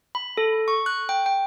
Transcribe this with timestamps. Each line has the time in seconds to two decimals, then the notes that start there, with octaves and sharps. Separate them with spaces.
0.15 B5
0.37 A4
0.68 C#6
0.86 F#6
1.09 G5
1.26 G5